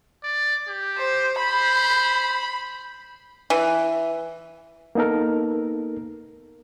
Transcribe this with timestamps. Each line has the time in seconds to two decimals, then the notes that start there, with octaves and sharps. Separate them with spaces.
0.23 D5
0.67 G4
0.98 C5
1.39 C5 B5
3.50 E3
4.95 A#3 B3 D#4 A4 A#4